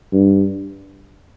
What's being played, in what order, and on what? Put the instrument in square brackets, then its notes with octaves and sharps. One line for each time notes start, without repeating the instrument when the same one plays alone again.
[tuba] G2